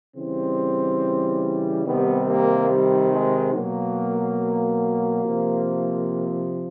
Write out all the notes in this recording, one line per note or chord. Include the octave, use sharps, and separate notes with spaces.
C#3 E3 G3 C4
C3 D#3 G3 B3
A#3
G3
G#3
B2 F#3 A#3
C3 F3